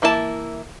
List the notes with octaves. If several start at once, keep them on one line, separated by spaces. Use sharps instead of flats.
E3 A#3 E4 G#4 A5